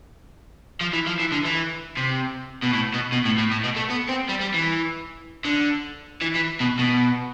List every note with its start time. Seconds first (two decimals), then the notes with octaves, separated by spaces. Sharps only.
0.81 F3
0.93 E3
1.07 F3
1.20 E3
1.32 D3
1.45 E3
1.97 C3
2.63 B2
2.74 A2
2.94 B2
3.12 B2
3.25 A2
3.38 A2
3.51 A2
3.64 B2
3.76 A3
3.90 B3
4.09 C4
4.29 G3
4.41 G3
4.54 E3
5.45 D3
6.21 E3
6.35 E3
6.60 B2
6.79 B2